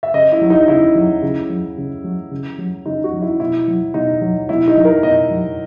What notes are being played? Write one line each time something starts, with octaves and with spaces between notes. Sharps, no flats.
E5
C#3 D#5
E4
F#3
D#4
C#3 E4
F#3
C#3
F#3
C#3
F#3
C#3
F#3
C#3 D#4
F#4
F#3
E4
B2 E4
F#3
B2 D#4
F#3
B2 E4
D#4
F#3
A#4
B2 D#5
F#3